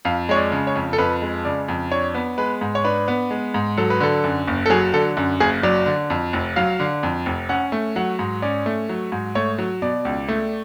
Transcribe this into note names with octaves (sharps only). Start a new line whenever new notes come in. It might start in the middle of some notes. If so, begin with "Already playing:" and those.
F2 F5
G#3 C#5
D5
C#3
C#5
F2
A4
F2 B4
G#3
C#3 D5
F2
D4 C#5
B3
G#3 B4
G#2
C#5
D4 B4
B3
G#3
G#2
F#3 A4
B4
D3 A4
F#2
F#1
A4
F#3 G#4
D3 A4
F#2
F#1 G#4
F#3 D5
D3
F2
F1
F#3 F5
D3
F2
F1
C#4 F#5
A3
F#3 F#5
G#2
C#4 D5
A3
F#3
G#2
A3 C#5
F#3
B2 D5
C#2
A3